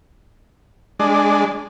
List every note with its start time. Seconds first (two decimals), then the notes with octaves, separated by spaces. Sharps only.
0.99 G#3 D4